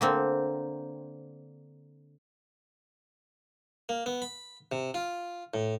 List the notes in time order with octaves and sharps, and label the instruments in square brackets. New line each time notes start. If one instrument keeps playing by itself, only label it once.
[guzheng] D3 A#3 C4
[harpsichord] A#3
B3
B5
C3
F4
A2